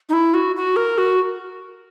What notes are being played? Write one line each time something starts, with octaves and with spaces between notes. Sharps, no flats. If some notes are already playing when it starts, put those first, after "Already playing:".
D#4
E4
F#4
F#4
A#4
F#4